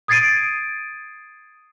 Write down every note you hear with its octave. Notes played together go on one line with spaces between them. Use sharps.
D#6 G#6 A6 C7 D7 D#7